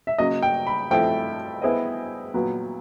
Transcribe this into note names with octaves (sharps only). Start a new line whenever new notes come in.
E5
C#3 F#3 A#3 D#5
G5
B5
F3 A3 C4 E4 A4 G5
B3 E4 G#4 C5 D#5
A#2 F#3 B3